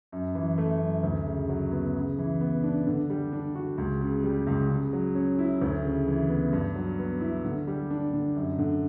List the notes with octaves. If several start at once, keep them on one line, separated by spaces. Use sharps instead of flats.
F#2
E3
A3
F#2
D2
C#3
F#3
B3
C#3
E3
B3
D4
D3
G3
D4
F#4
C#2
C#3
G3
C#2
C#3
F#3
C#4
E4
D2
C#3
E3
B3
G2
F#3
B3
E4
D3
G3
D4
D3
F#2
D3